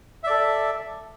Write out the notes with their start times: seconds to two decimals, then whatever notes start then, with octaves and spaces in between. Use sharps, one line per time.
0.24 E5
0.27 D5
0.30 A4